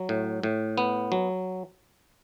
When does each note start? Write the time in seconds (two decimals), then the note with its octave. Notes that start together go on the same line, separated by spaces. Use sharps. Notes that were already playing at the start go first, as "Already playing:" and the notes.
Already playing: F#3
0.09 A2
0.43 A2
0.78 B3
1.12 F#3